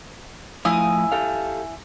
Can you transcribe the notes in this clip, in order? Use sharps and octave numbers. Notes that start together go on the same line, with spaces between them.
A2 F3 E4 F5 G#5 D#6
G4 A4 F5